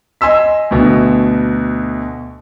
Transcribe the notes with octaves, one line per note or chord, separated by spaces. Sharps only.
D#5 G#5 C6 E6 B6
D2 B2